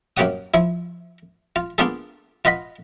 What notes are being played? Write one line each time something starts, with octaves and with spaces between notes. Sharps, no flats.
F#2 A#3 G4 C#5 F#5 D#6
F3 E4
F4
A#3 B3 D4 F4 G#4 A4
F4 B4 D#5 F#5 B5